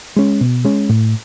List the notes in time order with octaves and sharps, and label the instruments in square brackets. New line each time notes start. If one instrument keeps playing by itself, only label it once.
[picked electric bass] G#3 C#4
B2
G#3 C#4
A2